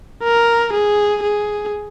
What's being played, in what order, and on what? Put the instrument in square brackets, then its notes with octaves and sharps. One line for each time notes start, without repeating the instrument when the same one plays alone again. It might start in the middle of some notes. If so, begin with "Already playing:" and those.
[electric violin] A#4
G#4
G#4